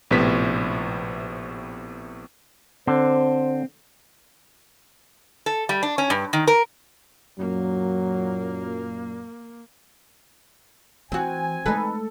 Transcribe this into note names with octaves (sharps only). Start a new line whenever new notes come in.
A#1 A2 C3 B3 B6
D3 C4 C5
A4
G3
D4
C#4
G2
D#3
A#4
F#2 A#2 F#3 A#3
E3 C4 F#4 G#5
G#3 A3 D#4 A4 B4